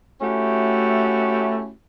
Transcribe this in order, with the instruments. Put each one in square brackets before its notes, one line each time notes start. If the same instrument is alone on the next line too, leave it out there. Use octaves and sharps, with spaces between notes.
[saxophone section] A3 C#4 E4 F#4 G4